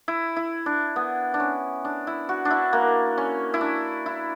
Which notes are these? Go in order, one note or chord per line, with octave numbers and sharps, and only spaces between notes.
E4
E4
D4
B3
D4
C#4
D4
E4
F#4
D4
E4
A#3
C#4
E4
D4
E4